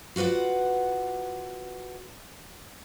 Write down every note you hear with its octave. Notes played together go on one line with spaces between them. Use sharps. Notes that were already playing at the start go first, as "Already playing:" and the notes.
F4 F#4 B4 D5 F#5